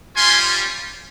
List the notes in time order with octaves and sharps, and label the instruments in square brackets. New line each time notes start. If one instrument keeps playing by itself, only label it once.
[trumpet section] G3 C#4 F4 G#5 C6